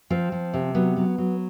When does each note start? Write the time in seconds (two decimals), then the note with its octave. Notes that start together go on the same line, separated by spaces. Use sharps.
0.10 F3 C4
0.32 F3
0.54 C3
0.75 F#3 B3
0.96 F#3
1.18 F#3